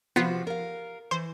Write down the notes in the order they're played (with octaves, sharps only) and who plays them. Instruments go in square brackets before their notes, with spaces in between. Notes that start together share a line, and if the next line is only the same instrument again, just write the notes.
[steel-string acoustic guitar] C3 F3 F#4 [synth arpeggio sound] B3 F4
[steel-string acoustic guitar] A#4 F5
[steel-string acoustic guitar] E3 [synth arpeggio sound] C5